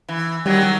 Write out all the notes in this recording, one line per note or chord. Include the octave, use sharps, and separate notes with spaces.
E3
D#3 F#3 G3